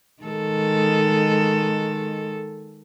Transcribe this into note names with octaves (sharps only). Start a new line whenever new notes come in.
D#3 G#3 A4